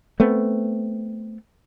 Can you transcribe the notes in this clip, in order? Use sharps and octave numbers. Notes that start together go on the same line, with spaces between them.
A3 B3 C4